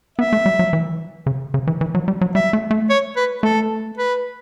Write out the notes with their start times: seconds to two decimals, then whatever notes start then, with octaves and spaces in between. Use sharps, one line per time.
0.18 B3 E5
0.33 A3
0.46 G3
0.59 F#3
0.73 E3
1.26 C#3
1.54 C#3
1.67 E3
1.81 E3
1.95 F#3
2.08 G3
2.21 F#3
2.35 G3 E5
2.53 A3
2.71 A3
2.90 C#5
3.16 B4
3.43 A3 A4
3.97 B4